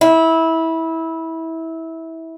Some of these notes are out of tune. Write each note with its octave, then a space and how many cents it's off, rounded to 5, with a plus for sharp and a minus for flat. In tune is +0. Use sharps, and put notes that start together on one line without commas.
E4 -20